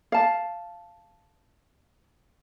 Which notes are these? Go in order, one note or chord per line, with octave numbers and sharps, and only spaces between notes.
F5 A5